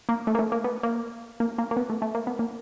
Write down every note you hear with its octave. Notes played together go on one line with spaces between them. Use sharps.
A#3
A3
A#3
A3
A#3
B3
A#3
A#3
A#3
A#3
B3
A3
A3
A#3
B3
A#3